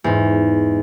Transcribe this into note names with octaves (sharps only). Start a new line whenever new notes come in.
E2 G#2